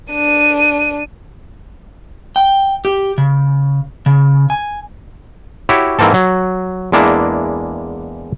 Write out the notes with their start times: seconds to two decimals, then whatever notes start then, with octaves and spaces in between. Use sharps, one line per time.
0.12 D4 D#7
2.36 G5
2.85 G4
3.18 C#3
4.06 C#3
4.50 G#5
5.69 E4 F#4 G4 C#5
5.99 G#2 E3 A#3 C4 A4
6.14 F#3
6.92 E2 G#3 A#3 D4 E4